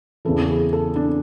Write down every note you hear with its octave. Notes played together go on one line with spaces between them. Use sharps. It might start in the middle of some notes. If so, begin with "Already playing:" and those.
E2 C#3 E3 A4
G#4
A4
D4